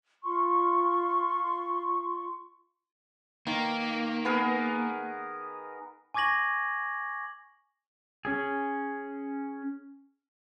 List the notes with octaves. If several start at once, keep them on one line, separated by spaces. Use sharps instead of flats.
F4 C6 C#6
D#3 A#3
B3 G#4 A#4
G#5 C#6 D6 G#6 A#6 F#7
C#4 G#4